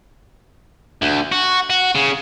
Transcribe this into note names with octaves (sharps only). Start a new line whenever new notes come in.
D2
F#4
F#4
C#3